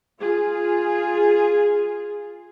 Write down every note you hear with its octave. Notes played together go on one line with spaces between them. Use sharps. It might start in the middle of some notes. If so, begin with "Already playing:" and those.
F4 G#4